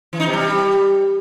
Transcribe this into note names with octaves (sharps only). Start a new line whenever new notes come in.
E3
D#4
C3
G3